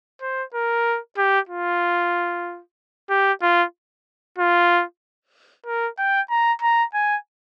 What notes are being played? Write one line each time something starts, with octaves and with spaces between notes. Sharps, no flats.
C5
A#4
G4
F4
G4
F4
F4
A#4
G5
A#5
A#5
G#5